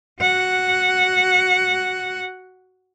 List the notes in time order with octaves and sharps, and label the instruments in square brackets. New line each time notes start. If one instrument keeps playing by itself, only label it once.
[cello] F#4 F#5